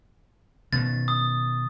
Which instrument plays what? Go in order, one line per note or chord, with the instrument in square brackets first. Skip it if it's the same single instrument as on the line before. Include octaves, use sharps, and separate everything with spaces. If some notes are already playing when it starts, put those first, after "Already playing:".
[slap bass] B2 D#3 [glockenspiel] A6
[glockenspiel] D#6